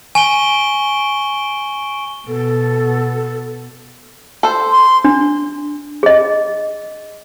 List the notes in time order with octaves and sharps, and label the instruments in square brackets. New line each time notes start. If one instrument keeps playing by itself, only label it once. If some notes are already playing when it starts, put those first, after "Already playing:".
[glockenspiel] G#5 [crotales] C#6 D7 G7
[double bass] B2 [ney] A4
[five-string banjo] A4 C5
[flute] C6
[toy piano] D4
G#4 D#5